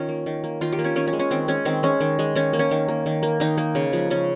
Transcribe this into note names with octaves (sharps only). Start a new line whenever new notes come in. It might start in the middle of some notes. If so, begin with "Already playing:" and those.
Already playing: D#3 C#4 F4
A#3
D#3
A#3
D#3 F4
G4
A#3
C#4
D#3 C#4
C#4
G#3
C#4
D#3 C4
G#3 C#4
D#3 C4
G#3 C#4
D#3
G#3
D#3 C#4
A#3
C#4
D#3
A#3
D#3
A#3
D#3 D#4
A#3
C#3
F3 G#3
C#3 C#4